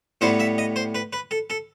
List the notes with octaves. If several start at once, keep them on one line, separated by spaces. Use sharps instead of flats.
A2 G3 B3 C5
E5
D#5
C5
B4
B4
A4
A4